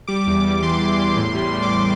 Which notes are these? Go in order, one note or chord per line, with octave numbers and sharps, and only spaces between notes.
G3 D6
E2
G3
E3 C6
E3
E2
A2
G3
G3
D6
C6